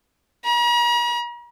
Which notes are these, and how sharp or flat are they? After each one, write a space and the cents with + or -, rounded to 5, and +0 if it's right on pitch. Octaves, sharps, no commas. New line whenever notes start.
A#5 +45